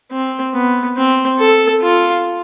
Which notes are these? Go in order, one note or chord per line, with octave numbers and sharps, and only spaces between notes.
C4
B3
C4
A4
F4